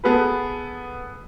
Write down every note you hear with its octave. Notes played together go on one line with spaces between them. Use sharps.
B3 G#4 A4 B4